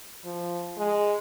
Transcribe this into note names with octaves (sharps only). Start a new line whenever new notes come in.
F3
G#3